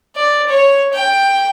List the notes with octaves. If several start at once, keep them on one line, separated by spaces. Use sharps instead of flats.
D5
C#5
G5